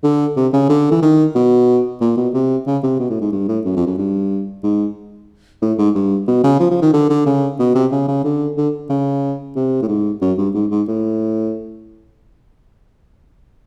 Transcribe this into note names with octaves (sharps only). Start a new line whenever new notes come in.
D3
C3
C#3
D3
E3
D#3
B2
A#2
B2
C3
C#3
C3
B2
A2
G#2
G2
A2
F#2
F2
F#2
G2
G#2
A2
G#2
G2
B2
C#3
F3
F3
D#3
D3
D3
C#3
B2
C3
C#3
C#3
D3
D3
C#3
C3
A2
G#2
F#2
G2
G#2
G#2
A2